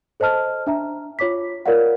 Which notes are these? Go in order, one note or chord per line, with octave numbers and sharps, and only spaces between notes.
A4 C5 D#5 A5 F6
D4 E5 A#5
F4 C#5 D6 B6
F4 A#4 C#5 D5 F5 F#5